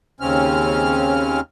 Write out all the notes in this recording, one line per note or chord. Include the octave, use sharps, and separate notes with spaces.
D#2 C#3 C4 C#4 F6